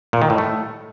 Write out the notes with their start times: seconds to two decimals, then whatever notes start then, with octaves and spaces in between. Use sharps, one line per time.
0.13 A#2
0.22 D#3
0.30 A2
0.38 A3